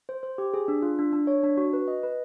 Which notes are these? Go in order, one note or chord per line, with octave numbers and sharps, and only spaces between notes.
C5
C5
G4
G#4
D4
F4
D4
D4
C#5
D4
F#4
B4
D#5
B4